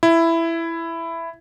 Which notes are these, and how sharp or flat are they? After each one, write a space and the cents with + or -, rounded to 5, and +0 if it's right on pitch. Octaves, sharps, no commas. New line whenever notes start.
E4 +10